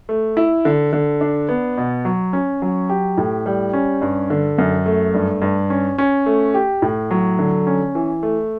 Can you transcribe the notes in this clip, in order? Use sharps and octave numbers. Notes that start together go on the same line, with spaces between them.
A3
E4
D3
D3
D4
B3
B2
F#3
C#4
F#3
G4
A2
G3
C#4
G2
D3
F#2
A3
G2
G2
C#4
C#4
A3
G4
A2
F#3
D3
C#4
E3
A3